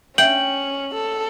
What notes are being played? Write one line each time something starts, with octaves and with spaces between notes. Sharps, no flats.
C#4 G5 F#7
A4